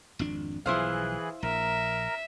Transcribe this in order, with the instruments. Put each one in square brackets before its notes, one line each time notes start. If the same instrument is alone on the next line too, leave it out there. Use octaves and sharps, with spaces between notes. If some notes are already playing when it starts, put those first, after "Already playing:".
[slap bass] G#1 F2 D4
[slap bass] B1 F3 [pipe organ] E3 G#4 F#6 [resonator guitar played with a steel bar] E4 C5 F5
[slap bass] A#1 [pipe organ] A#4 A#5 [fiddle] E5